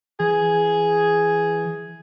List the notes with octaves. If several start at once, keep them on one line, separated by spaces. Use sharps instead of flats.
E3 G#4